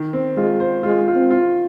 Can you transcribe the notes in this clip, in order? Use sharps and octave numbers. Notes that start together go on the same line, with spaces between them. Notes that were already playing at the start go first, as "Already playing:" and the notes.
Already playing: D#3
C4
G#3 F4
C5
G#3 F4
F4
C4
F4